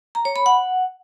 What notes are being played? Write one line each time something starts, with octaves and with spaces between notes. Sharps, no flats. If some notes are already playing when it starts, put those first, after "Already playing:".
A#5
C#5
B5
F#5